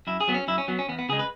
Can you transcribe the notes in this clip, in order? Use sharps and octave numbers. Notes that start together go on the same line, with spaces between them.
F#2 E4
G#4
F#3 B3
C#4
F#2 E4
C#4
F#3 B3
C#4
E2 B3
B3
C#3 G#3 G#4
B4